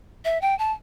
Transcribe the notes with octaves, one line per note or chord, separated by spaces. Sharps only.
E5
G5
A5